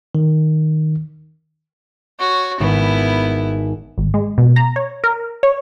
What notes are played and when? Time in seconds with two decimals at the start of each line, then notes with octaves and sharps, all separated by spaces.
0.15 D#3
2.20 F#4 C#5
2.60 G#1 B3 E4
3.98 G#1
4.14 G#3
4.38 B2
4.56 A#5
4.76 C#5
5.04 A#4
5.43 C#5